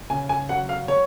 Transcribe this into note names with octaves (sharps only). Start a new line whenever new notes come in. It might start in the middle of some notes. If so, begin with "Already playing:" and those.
C#3 G#5
G#5
F#3 F#5
F5
C#5